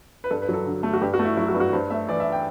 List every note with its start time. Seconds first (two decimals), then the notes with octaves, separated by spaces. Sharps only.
0.24 B4
0.30 G2 A4
0.42 B4
0.49 F#3 A4
0.66 D3
0.83 A3
0.93 F#4
1.01 G2 G4
1.13 F#4
1.19 A3
1.25 E4
1.37 F#3 E4
1.48 F#4
1.54 G2
1.60 F#4
1.73 G2 C5
1.90 A3 E5
2.09 E3 D5
2.20 E5
2.32 G5